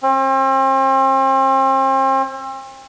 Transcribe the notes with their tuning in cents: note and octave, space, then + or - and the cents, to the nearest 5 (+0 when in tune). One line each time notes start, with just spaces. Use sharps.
C4 +40